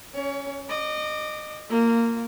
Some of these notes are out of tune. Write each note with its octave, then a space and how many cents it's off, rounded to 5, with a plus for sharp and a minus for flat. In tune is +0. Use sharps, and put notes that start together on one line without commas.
C#4 +0 C#5 +30
D#5 -25 D6 +0
A#3 -15 F4 +0